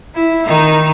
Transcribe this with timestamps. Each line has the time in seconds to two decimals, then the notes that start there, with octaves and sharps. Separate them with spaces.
0.15 E4
0.46 D#3 D#4